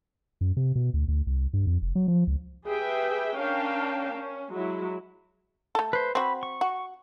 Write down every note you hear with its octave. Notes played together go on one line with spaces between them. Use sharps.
F#2
C3
B2
D2
D2
C2
G2
F2
F1
F#3
F3
C#2
G4 G#4 B4 E5 G5
C#4 D4 A#4 F5 G5 A5
C#4
F#3 G#3 E4
A3 A4
B4 C5
C4 F#4 B5
C#6
F#4